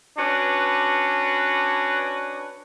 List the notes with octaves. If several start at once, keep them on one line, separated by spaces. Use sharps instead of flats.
C#4 D4 F#4 B4